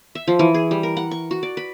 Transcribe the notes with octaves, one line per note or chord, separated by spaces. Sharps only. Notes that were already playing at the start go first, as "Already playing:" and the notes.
E5
F3
E3
G#4
G3
A#4
F#5
C#6
F#4
D5
B4